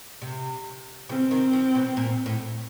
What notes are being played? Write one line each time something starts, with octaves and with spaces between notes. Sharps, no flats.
C3
C#3 C4
D#3
F3
B2
A#2
A2